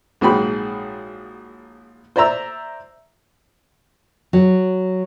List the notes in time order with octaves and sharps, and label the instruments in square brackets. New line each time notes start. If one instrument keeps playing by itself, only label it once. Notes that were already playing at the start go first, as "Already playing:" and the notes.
[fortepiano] A#1 G#2 F#3 G#4 G5 B5
C5 D5 E5 A#5 E6
[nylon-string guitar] F#3